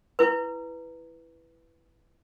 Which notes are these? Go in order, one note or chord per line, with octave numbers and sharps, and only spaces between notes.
E4 B4